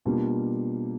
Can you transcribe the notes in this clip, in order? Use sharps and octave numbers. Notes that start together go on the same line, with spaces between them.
B2 G3 A#3 D4 F4